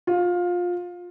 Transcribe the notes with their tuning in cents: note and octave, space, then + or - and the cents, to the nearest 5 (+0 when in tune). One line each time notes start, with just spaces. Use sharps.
F4 +20